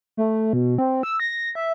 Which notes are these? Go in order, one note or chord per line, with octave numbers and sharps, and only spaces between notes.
A3
B2
C4
E6
A#6
E5